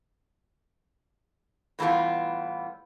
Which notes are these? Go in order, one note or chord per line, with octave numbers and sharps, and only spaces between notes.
A2 E3 G3 B3 F4